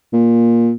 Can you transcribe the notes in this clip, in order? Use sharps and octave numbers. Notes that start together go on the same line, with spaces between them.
A#2